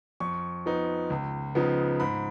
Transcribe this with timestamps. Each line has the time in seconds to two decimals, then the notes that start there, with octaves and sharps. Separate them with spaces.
0.20 F2 C#6
0.66 F3 B3 D#4
1.10 C#2
1.55 C#3 F3 B3 D#4
2.00 G#2 B5